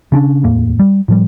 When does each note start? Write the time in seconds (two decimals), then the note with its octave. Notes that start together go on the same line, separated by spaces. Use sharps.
0.12 C#3 C#4 D4
0.43 D1 E2 A2 A#3
0.80 G3
1.08 A2 F3 G3